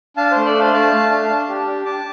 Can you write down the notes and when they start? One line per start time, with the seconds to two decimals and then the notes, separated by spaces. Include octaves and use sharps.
0.17 D4 F5 A5
0.31 A3 C5
0.45 A4 D5
0.55 D4 C5 F5
0.73 A3 F5 A5
0.92 A3
1.11 D4
1.29 D4
1.49 G4
1.67 D4
1.86 D4 A5 D6